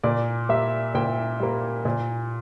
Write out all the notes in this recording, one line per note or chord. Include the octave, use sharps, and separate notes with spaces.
A#2 D5
G3 A#3 E5
A#2 G5
G3 A#3
A#2